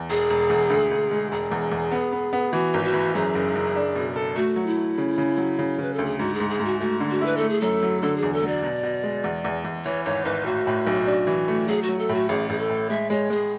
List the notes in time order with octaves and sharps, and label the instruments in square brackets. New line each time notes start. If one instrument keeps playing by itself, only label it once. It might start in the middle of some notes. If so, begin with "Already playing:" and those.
Already playing: [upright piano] E2
[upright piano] E1 [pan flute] G#4
[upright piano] E1
E2
D2
D2
G#3
[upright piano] E1 [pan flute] G#4
[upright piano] E2
E2
B3
B3
B3
[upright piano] E3 [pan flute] F#4
[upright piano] G#1
[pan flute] F#4
[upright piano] E3
[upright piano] F#2 [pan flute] G#4
[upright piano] F#1
F#1
D4
B2
A4
[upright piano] A3 [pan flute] F#4
[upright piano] F#3
[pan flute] E4
[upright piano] A3
C#3
C#3
F#3
C#3
[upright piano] C#3 [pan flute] B4
[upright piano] D2 [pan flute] A4
[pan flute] G#4
[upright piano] G#2 [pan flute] F#4
[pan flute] G#4
[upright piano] G#2
[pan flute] G#4
[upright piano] G#2
[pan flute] F#4
[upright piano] A3 [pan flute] F#4
[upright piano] D3
[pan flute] F#4
[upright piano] E4 [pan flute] B4
[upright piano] A3 [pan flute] A4
[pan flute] G#4
[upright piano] F#2 [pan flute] A4
[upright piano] F#3
[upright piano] D3 [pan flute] A4
[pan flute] G#4
[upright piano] E2
[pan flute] A4
[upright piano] F#3 [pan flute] D5
[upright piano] B2
B2
G#3
E2
E2
E2
[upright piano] E3 [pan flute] C#5
[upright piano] G#1 [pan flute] C#5
[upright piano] G#1 [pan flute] B4
[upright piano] A2 [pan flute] F#4
[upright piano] A2
B1
D4
E3
A3
[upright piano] F#3 [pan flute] G#4
[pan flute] F#4
[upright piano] F#3
[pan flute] A4
[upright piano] A2
[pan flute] F#4
[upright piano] A1 [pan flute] G#4
[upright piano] A1 [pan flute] G#4
[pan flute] A4
[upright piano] A2
[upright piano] G#3 [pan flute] E5
[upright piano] G#3 [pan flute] C#5
[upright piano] G#3 [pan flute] G#4